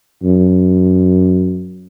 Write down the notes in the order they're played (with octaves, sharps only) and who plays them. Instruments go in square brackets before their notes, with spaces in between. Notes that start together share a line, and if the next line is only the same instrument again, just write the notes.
[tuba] F#2